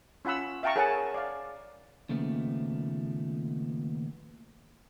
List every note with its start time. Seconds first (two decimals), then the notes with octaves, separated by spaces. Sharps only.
0.25 C#4 F4 F#5 B5 E6
0.63 E5 F5 G5 A5 A#5 C#6
0.76 G#4 A#4 C#5 F#5 G#5 A5
1.14 D5 F5
2.09 D#2 A#2 C#3 F3 A3 B3